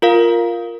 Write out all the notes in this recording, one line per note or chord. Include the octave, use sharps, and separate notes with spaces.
F4 A#4 F5